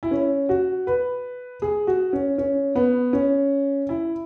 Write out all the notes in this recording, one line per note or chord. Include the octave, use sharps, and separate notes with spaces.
E4
C#4
F#4
B4
G#4
F#4
C#4
C#4
B3
C#4
E4